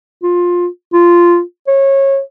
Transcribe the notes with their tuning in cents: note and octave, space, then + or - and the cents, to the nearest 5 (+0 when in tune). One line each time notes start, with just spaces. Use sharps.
F4 +15
F4 -10
C#5 -25